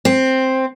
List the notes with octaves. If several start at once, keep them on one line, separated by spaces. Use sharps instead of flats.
C4